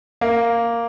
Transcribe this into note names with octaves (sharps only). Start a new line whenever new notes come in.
A#3